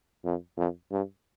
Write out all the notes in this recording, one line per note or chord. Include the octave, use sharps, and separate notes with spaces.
F2
F2
G2